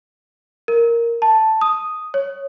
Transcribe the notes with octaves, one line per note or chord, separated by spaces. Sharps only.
A#4
A5
D#6
C#5